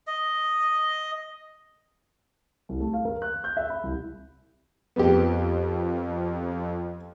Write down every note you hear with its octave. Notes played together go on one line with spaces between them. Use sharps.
D#5
C2
A3
F5
A#4
F#6
G6
E5
B5
C2
F2 B3 G4